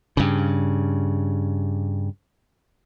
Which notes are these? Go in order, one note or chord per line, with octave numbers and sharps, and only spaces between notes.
G2 C#3